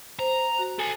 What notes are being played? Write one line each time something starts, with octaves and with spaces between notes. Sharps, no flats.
C5 A#5
F#4
A4 G#5